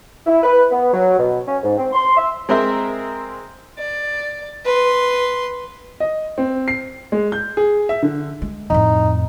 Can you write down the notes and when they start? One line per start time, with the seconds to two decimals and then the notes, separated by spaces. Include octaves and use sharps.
0.27 E4
0.43 B4
0.71 B3
0.93 F#3
1.18 B2
1.48 C#4
1.63 G#2
1.78 C4
1.93 C6
2.17 E5
2.49 G#3 C4 A#4 C5 E5
3.79 D5
4.65 B4 C6
6.00 D#5
6.38 C4
6.68 C7
7.12 G#3
7.32 G6
7.57 G#4
7.89 E5
8.03 D3
8.42 G#3
8.70 F2 A2 D#4